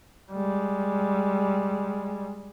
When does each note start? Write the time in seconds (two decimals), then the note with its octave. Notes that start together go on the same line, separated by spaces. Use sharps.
0.32 G3 G#3